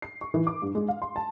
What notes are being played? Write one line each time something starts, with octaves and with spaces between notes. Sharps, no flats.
C7
C#6
E3
D6
G2
G#3
F5
C6
A5